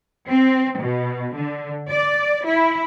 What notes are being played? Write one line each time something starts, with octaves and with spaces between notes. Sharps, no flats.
C4
B2
D3
D5
E4